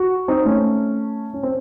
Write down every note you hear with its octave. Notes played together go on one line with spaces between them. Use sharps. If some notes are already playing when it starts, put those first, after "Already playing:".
Already playing: F#4
C4 D#4
A3 C#4
C#4
C4